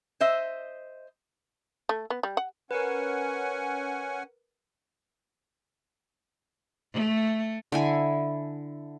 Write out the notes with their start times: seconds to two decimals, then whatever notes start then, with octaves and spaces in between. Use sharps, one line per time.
0.20 C5 D#5 E5
1.89 A3
2.10 B3
2.23 G3
2.37 F#5
2.71 C#4 A#4 B4 F#5 G#5
6.93 A3
7.72 D3 E4 G#5